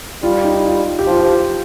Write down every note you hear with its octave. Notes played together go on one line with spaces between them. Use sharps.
G3 F4
D#4
F4
G4
F3 F4
G4